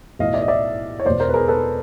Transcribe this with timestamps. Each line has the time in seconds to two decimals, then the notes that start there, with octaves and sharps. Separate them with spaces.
0.19 B1 A2 E3 D#5 F5
0.34 D5 E5
0.42 D#5
0.48 D5 E5
1.00 C#5
1.05 E1 E2 B2 C5 D5
1.20 A#4 C5
1.29 B4
1.34 G#4 A#4
1.48 A4 B4